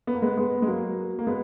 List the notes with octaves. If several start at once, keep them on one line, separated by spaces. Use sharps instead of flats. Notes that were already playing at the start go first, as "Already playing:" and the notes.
B3
A#3
G#3 B3
G#3 B3
G#3
F#3 A#3
A#3
G#3 B3